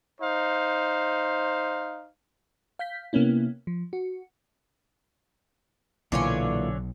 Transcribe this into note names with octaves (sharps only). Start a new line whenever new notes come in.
D#4 C5 F5
F5 G6 B6
C3 A#3 B3 C#4 E4
F3
F#4
B1 A#2 D3 E3 F#3 F4 C#5 G#5